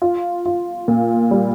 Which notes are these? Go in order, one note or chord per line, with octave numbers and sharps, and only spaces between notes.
F4
F4
A#2
G3